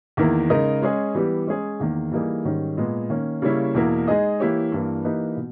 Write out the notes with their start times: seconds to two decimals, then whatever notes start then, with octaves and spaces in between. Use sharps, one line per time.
0.17 E2 D#3 A#3 E4 A#4
0.50 C#3 G#3 D#4 A#4 D#5
0.82 G#3 C#4 G#4 D#5
1.15 E3 G3 B3 G4
1.47 G#3 C#4 G#4 C#5
1.80 E2 D#3 A#3
2.12 E3 G3 A#3 D#4 G#4
2.45 G#2 D#3 G3 C#4
2.77 A#2 G#3 B3
3.10 D#3 A#3 C#4
3.42 C#3 G3 A#3 C#4 E4
3.75 E2 B2 A#3 E4 A#4
4.07 G#3 D#4 G#4 D#5
4.40 E3 A#3 E4 G4 C#5
4.72 G2 E3 A#3
5.04 E3 A#3 D#4 G4 B4
5.37 B2